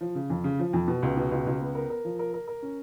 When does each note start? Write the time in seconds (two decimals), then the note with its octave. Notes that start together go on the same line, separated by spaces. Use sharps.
0.01 F3
0.15 C#3
0.30 F2
0.44 C#3
0.59 F3
0.73 F2
0.88 B2
1.03 C#2
1.17 B2
1.31 C#2
1.47 C#2
1.61 B3
1.75 A#4
1.90 A#4
2.05 F3
2.19 A#4
2.34 A#4
2.48 A#4
2.62 C#4